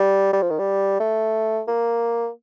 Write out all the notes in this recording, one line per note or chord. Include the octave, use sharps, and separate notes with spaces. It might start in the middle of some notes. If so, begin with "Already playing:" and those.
Already playing: G3
G3
F3
D#3
G3
A3
A#3